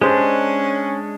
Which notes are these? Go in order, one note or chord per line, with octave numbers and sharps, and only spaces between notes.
G#3 C#4 D4 G4 G#4 C5